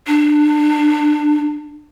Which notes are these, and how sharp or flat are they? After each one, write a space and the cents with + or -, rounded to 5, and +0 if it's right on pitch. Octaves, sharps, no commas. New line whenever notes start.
D4 +25